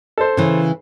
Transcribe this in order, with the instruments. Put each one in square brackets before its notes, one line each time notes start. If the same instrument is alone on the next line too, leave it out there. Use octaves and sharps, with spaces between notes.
[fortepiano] A4 C5
[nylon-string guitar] C#3 E3